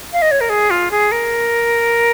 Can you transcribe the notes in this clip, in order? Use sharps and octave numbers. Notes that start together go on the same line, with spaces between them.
F5
D#5
C#5
A#4
G#4
F4
G#4
A#4